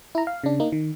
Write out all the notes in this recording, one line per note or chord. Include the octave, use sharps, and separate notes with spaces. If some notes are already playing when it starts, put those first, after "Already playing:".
E4 A#5
F5
C#3 D4
A#3 D#4
D#3